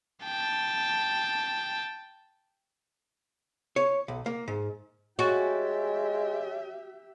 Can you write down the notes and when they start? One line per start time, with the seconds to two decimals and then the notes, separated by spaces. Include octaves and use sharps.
0.24 G5 A5
3.76 C#5
4.08 B1
4.26 A#3
4.48 G#2
5.19 G#3 F#4 G4 C#5 E5 G#5 A6